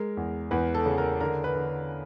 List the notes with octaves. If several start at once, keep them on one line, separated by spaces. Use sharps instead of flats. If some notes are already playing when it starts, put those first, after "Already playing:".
Already playing: G#3 A#4
E2
E2 B4
A4
C#3
A#4
D3 A#4
B4
D3